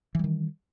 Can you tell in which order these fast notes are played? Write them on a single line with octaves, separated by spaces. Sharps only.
E3 G3 D#3